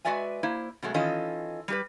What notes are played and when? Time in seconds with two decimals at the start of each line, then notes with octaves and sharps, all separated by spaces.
0.05 G#3 F#4 B4 D5 E5 G#5
0.43 A#3 E4 C5
0.82 B2 F#3 G#3 A3
0.94 D#3 E3 C#4 F4 A4 D#5
1.68 G3 G4 B4